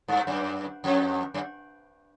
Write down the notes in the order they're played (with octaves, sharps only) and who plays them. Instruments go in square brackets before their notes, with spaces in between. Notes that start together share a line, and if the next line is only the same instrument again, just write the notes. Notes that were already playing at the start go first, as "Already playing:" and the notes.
[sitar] G2
F#2
F2
F#2